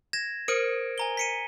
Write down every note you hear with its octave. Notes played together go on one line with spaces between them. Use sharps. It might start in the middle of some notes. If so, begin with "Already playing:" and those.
G#6 A#6 E7
A#4 C5 D7
G#5 A#5 G7
B6 C#7 D#7